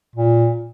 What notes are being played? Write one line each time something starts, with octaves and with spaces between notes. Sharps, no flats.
A#2